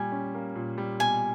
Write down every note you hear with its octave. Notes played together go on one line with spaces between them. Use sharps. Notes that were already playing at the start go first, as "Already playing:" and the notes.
Already playing: A#2 G3 G#5
C#4
A#3
A#2
G3
B2 G#5